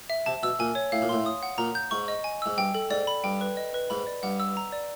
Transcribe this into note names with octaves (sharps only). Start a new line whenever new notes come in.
E5
C3 A5
B2 E6
A#2 G#5
C#5
A2 F5
A#2
A2 C6
D#6
F#5
A#2 A#5
G6
G#2 C#6
D#5
G#5
G#2 E6
G2 G5
A4
G#2 D5
B5
G2 G5
B4
D#5
B4
G#2 B5
D5
G2 F#5
E6
A#5
D5